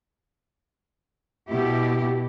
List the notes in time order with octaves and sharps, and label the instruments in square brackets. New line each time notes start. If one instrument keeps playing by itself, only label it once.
[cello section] B2 E4 G4